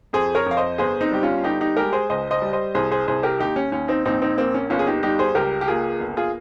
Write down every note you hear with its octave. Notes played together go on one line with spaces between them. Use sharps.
F2 G#4 C5
A#4 C#5
F2 F5
C5 D#5
G1 G#4 C5
C4 D#4
G3 G4
C#4 F4
G1 D#4 G4
D#4 G4
G#3 G4 A#4
G#4 C5
C#2 C5 D#5
C5 D#5
G3
C5 D#5
C2 G#4 C5
G#4 C5
C2 G#4 C5
G4 A#4
D#2 D#4 G4
C#4
D#2 C#4
C4 D#4
A#1 C4 D#4
C4 D#4
A#3 C4
C#4
G1 C#4 F4
G#4
D#4 G4
G3 D#4 G4
G#4 C5
C#2 G4 A#4
G4
A#3 F4 G#4
G1
F4 G#4